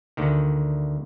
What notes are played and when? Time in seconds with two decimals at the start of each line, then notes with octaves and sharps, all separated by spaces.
0.17 D2 D3 D#3